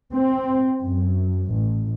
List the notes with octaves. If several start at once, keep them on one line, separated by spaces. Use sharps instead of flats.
C4
F#2
A1